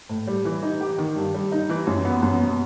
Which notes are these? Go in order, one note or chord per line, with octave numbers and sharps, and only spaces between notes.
A2
G3
E3
D#4
G4
D#3
G2
G3
D#4
E3
F#2
B3
F#2
B2